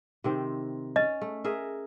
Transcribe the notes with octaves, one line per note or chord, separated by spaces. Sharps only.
C3 D#3 C4
C#4 D#5
A3
G#4 A#4 E5